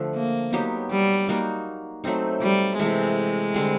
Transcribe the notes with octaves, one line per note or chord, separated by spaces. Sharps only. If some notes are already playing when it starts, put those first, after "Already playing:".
Already playing: D3 F3 A3
A#3
F#3 B3 D#4 G4
G3
A#3 D#4 F#4
F#3 A3 C4 D#4
G3
C3 E3 G#3 A3
D3 G3 C4